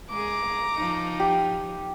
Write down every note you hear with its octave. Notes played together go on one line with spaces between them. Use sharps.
G#3 G#4 A#5 D6
F3 D#4
G4